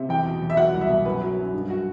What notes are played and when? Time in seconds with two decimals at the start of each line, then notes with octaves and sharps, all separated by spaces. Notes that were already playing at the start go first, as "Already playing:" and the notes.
Already playing: C3
0.09 E2 G5
0.26 B2
0.42 E2
0.50 E5
0.57 F#3 F#5
0.73 C2
0.81 E5
0.89 B2
1.05 F#2 B4
1.22 F#3
1.38 F#2
1.54 G2
1.70 F#4